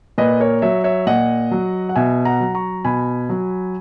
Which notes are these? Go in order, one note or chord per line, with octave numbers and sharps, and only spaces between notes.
A#2 B4 D#5
A#4 C#5
F#3 C#5 E5
C#5 E5
A#2 D#5 F#5
F#3
F#5
B2 E5 G#5
F#5 A#5
F#3
A#5 C#6
B2 G#5 B5
F#3